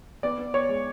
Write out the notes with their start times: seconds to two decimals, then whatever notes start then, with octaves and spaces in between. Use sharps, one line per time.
0.23 B3 D5
0.38 B3
0.54 B3 C#5
0.69 G#3